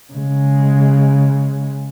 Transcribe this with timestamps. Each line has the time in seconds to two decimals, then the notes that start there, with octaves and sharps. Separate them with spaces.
0.13 C#3 G#3